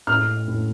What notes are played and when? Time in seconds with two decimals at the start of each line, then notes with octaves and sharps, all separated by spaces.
0.07 A2 F6
0.47 A2